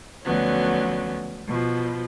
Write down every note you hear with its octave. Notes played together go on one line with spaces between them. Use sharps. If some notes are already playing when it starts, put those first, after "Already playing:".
D2 D3 F3 F#3 B3 C#4
B2 F3